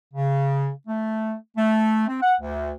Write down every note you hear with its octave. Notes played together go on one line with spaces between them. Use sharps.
C#3
A3
A3
C4
F#5
D2